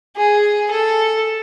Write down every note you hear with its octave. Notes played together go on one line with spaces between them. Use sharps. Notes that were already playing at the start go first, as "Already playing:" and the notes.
G#4
A4